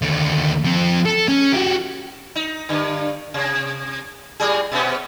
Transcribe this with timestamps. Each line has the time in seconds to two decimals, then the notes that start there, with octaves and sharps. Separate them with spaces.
0.02 D#2 D3
0.65 F3 C4
1.06 A4
1.28 C#4
1.52 F#4 G4
2.36 D#4
2.69 G2 D3
3.34 C3
4.40 A2 G3 G#4
4.72 B2 B3 C#4